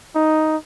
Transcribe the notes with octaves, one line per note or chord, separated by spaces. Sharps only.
D#4